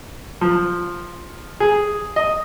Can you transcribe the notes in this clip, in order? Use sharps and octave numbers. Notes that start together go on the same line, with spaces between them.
F3
G#4
D#5